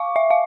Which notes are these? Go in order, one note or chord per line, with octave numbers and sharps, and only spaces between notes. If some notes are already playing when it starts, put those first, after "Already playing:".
Already playing: F5 C#6 D6
E5
F5